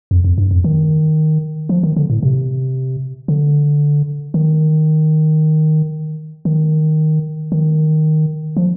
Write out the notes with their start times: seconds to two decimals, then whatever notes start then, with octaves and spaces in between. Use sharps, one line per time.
0.11 F2
0.24 F2
0.38 G2
0.51 F2
0.64 D#3
1.69 F3
1.83 D#3
1.97 D3
2.10 A2
2.23 C3
3.28 D3
4.34 D#3
6.45 D#3
7.52 D#3
8.57 F3